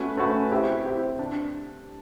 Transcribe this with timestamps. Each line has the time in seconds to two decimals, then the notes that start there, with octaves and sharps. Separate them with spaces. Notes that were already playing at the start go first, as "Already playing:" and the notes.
Already playing: A3 C#4 F#4 B4
0.17 A3 C#4 F#4 B4
0.52 C4 E4 G4
0.85 C4 E4 G4
1.19 D4